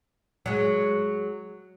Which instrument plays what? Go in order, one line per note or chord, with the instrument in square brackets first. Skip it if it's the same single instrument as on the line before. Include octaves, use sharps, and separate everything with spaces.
[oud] F#3 G#3